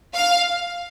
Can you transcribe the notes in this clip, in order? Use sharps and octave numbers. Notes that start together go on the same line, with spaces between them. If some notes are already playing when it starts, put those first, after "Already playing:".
F5